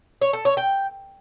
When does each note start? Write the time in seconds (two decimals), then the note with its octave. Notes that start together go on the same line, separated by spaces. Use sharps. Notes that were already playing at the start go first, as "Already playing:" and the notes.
0.21 C#5
0.33 A4
0.45 C#5
0.57 G5